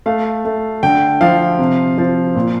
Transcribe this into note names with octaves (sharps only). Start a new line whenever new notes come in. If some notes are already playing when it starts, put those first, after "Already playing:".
A3 F5
A3
D3 G5
F3 F5
C3
F3
A#2